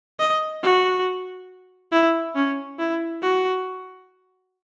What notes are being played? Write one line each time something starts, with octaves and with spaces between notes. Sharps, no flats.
D#5
F#4
E4
C#4
E4
F#4